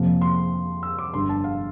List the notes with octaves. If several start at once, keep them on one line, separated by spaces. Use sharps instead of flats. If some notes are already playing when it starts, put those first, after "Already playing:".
Already playing: F2 C3 F3 A#3
C6
E6
D6
G1 G2 D3 C6
A5
F5